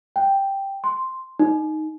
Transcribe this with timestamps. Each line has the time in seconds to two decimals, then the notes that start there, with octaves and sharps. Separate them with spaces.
0.16 G5
0.84 C6
1.39 D#4